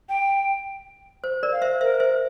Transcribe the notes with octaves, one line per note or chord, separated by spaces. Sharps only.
G5
C5
A#4 D5
F5
C5 E5
A#4 C5 E5
C5 E5